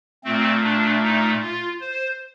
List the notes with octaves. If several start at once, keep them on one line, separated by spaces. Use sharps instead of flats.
A#2 A3 C4
D4
D#4
F4
C5